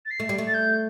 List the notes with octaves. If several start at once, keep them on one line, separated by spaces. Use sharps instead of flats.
A6
C7
A3
G3
A3
A6
G6